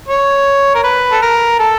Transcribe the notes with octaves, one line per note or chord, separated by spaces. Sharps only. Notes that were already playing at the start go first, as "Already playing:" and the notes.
C#5
A#4
B4
A4
A#4
A4